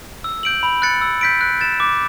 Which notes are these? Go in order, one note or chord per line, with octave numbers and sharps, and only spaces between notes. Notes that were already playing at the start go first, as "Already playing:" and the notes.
E6
G6 D7 F#7
B5
F#6 A6 C#7
E6
G6 B6 D7
F#6
A6 E7
D6